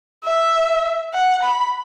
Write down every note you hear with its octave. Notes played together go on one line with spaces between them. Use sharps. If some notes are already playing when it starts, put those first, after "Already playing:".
E5
F#5
B5